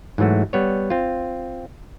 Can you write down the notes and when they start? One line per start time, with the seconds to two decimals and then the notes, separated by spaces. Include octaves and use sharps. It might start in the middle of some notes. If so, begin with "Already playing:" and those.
0.18 G#2 E3 F#3 A3 F#4
0.53 G3 B3 C#5
0.90 C4 F4